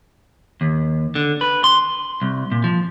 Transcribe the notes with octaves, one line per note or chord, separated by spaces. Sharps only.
D#2
D3
B4
C6
C2
A#2
F3